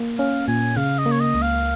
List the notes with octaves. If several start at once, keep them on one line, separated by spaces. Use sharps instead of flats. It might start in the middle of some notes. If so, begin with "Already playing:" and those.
Already playing: A#3
C#4 F5
A#2 G#5
C#3 F5
D#5
A#3
C#5
D#5
C#2
F5